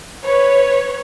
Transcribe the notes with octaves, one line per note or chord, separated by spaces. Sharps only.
B4 C#5